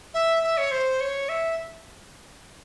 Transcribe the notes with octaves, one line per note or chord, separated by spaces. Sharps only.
E5
E5
C#5
C5
C#5
E5